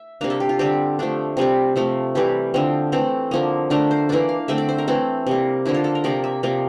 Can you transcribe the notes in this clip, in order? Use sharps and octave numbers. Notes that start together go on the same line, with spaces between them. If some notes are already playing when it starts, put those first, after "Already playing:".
Already playing: E5
C3 G3 A#3 D4 F5
A4
G4
F4
D3 G3 C4 G4
F3 A3 D4
C3 G3 C4 F4
C3 F3 A3
C3 E3 G3 G4
D3 F3 C4
E3 A3 C4 A4
D3 F3 A#3
D3 A3 D4 A#4
C5
E3 A#3 D4 D5
F5
D3 A3 C4 E5
D5
C5
A#4
E3 A3 C4 A4
C3 G3 A#3
D3 F3 A#3 D4 E4
F4
A4
A#4
C3 F3 A#3 D5
E5
C3 F3 A#3 D5